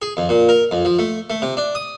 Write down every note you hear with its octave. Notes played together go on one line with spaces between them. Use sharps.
G#4
F2
A#2
A#4
F2
F3
A3
A3
C3
D4
D#6